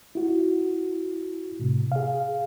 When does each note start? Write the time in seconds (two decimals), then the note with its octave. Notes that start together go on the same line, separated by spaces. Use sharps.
0.15 E4 F#4
1.60 A2 C3
1.92 G#4 F5